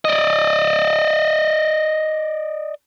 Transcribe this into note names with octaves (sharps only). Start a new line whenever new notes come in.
D5 D#5